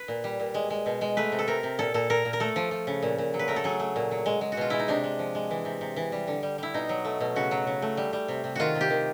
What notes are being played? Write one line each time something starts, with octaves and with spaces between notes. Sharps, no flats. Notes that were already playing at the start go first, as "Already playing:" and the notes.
Already playing: B4
A#2
G3
A#2
G#3
G#3
B2
G#3
A3 B4
C3
A4
C3 A#4
C3
A#2 A4
A#2 A4
A#2 A#4
A#2
A#4
A3 A4
F3
F3
C#3
A#2
A#2
F#3
B4
A3 A#4
A4
F#3 G#4
A3
A#2
F#3
G#3
G#3
F#4
B2 F4
G#3 E4
D#4
C3 D4
G#3
F3
G#3
E3
C3
C3
E3
G3
D3
G3
G3 E4
B2 D#4
F#3
A3
B2
C#3 F#4
F#3
C#3
A3
G3
G3
C3
C3
D#3 F4 F#4
C3
G4
D#3